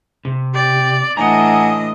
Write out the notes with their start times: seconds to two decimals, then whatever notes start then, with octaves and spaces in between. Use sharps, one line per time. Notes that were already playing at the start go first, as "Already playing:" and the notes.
0.25 C3
0.54 G4 D5
1.17 A2 E3 D4 D#5 F#5 G#5 A#5